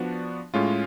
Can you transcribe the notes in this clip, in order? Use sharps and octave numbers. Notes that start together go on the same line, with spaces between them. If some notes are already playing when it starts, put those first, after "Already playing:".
Already playing: F3 B3 D4 F#4
A2 G#3 C#4 F4